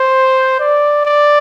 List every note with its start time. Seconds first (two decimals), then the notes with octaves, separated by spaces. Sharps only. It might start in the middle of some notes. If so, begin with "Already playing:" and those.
Already playing: C5
0.59 D5
1.05 D5